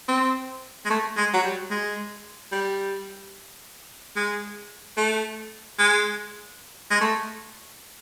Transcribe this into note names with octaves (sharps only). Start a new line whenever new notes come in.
C4
G#3
A3
G#3
F#3
G3
G#3
G3
G#3
A3
G#3
G#3
A3